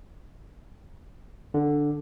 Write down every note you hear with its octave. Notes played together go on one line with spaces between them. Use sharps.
D3